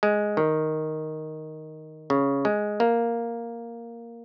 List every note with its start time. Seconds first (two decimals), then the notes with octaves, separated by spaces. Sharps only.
0.03 G#3
0.37 D#3
2.10 C#3
2.45 G#3
2.80 A#3